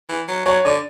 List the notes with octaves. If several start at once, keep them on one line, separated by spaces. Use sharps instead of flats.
E3
F#3
F#3 C#5
D3 D5